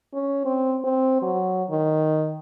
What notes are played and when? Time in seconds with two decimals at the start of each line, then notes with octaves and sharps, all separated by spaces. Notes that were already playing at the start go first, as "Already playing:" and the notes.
0.13 C#4
0.45 C4
0.84 C4
1.22 F#3
1.70 D#3